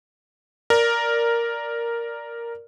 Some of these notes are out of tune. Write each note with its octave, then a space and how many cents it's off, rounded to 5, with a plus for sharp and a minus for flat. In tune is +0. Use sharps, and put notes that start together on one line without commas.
A#4 +0 D5 +0